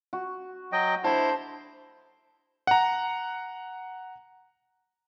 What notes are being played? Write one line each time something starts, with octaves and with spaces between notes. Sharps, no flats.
F#4
F#3 D#5 G5
D3 E4 C5 A5
F#5 A#5